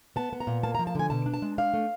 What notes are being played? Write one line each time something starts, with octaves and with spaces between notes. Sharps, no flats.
B3 A5
B3
A#5
A#2
A#3 A5
A#5
F3
A5
D3 G#5
B2 A5
D4
A5
G#3
D4 F5
A3